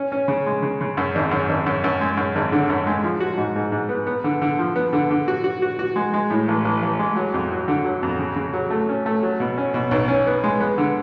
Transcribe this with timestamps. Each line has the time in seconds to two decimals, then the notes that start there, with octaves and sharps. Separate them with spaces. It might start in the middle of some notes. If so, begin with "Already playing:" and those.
Already playing: C#4
0.12 C#4
0.28 C#3
0.46 G#3
0.62 C#3
0.81 C#3
0.97 F#2
1.15 G#1
1.31 F#2
1.49 G#1
1.66 F#2
1.84 F#2
2.01 G#3
2.17 F#2
2.35 G#1
2.52 D3
2.70 F#2
2.87 G#3
3.03 F3
3.20 F#4
3.37 G#2
3.56 G#2
3.72 G#2
3.89 B3
4.07 B3
4.24 D3
4.42 D3
4.59 F3
4.76 B3
4.93 D3
5.10 D3
5.28 F#4
5.44 F#4
5.62 F#4
5.79 F#4
5.96 G#3
6.14 G#3
6.30 A2
6.48 A1
6.65 A1
6.83 A1
6.99 G#3
7.16 F#3
7.34 F2
7.51 F#3
7.68 D3
7.85 F#3
8.03 F2
8.19 C#3
8.36 C#3
8.53 F#3
8.70 A3
8.89 C#4
9.06 A3
9.23 F#3
9.40 B2
9.58 C#4
9.74 B2
9.91 B1
10.08 C#4
10.26 B3
10.44 G#3
10.60 B3
10.78 D3